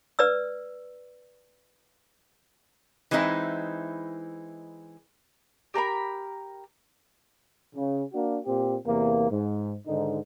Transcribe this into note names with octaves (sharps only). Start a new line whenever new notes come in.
B4 D5 E6
E3 G#3 C4 D#4 E4
G4 A#4 A#5 B5
C#3
A#3 D4 F#4
A#2 C4 G4
E2 C3 A#3
G#2
G#2 D3 D#3 D#4